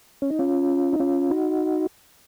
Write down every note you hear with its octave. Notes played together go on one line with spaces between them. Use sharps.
C#4
D#4
C#4 F4
D#4
C#4 F4
D#4 F#4